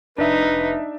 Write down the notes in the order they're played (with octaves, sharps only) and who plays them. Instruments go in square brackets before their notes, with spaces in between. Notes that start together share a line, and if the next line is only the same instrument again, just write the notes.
[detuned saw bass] F1 [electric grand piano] D4 E5 [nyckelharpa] D#4 [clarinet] B4